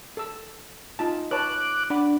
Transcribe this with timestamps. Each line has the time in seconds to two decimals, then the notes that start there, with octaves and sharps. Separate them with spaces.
0.17 A4 E6
0.99 D#4 F4 A5
1.31 B4 C#5 A5 D6 F#6
1.90 D4 F#5 B5 D6